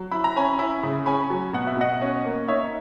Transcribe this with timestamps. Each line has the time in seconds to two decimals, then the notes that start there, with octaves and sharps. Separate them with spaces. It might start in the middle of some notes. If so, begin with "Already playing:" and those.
Already playing: F#3
0.11 E4 B5
0.24 A#5
0.36 C#4 G#5 B5
0.59 E4
0.83 C#3
1.06 C#4 G#5 B5
1.30 F#3
1.53 B2 F#5
1.67 E5
1.77 B2 D#5 F#5
2.01 C#4
2.25 A#3
2.48 D#4 C#5 E5